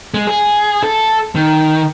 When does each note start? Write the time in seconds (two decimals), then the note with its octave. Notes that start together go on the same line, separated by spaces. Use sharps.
0.14 G#3
0.27 G#4
0.83 A4
1.35 D#3